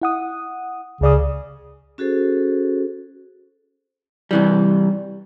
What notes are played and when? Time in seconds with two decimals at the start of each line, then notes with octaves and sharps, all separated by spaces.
0.02 E4 F#5 D#6
1.01 C#2 C#3 D5 D#6
1.98 C#4 F#4 G#4 A4 C5
4.31 C3 E3 G3